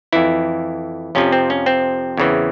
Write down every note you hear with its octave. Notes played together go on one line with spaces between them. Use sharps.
F2 E3 E4
F2 C3 F3 C#4
C4
C#4
C4
E2 C#3 E3